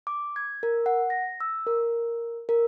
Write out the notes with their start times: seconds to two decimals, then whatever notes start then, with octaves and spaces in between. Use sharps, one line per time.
0.07 D6
0.36 G#6
0.63 A#4
0.86 F#5
1.10 A#6
1.40 E6
1.67 A#4
2.49 A#4